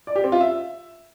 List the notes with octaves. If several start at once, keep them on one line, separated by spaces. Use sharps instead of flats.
D5
G4
C4
F4
E5